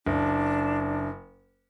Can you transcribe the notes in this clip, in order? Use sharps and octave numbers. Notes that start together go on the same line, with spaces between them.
F#1 D4